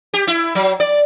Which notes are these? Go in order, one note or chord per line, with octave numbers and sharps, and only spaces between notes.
G4
E4
F#3
D5